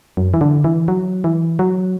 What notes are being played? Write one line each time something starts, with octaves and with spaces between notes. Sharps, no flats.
F#2
E3
D3
E3
F#3
E3
F#3